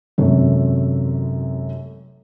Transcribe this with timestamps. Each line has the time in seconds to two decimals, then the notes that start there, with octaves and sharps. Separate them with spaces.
0.18 G#1 F#2 C3 A3